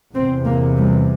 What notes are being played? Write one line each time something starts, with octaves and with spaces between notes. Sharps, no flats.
E2 C3 C4
A#3
G3